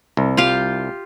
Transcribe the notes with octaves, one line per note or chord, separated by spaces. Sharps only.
C2
F4 G4 F5